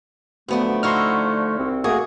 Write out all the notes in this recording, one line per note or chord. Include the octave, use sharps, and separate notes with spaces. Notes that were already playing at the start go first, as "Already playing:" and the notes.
F#2 D3 F3 A3 B3 D4
D#4 E4 F#4 C6 C#6 F6
C2 C4
A3 A#3 F#4 G#4